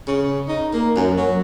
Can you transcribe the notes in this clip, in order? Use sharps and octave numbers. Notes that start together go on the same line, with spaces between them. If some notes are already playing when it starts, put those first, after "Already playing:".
C#3
D#4
A#3
F#2
F#3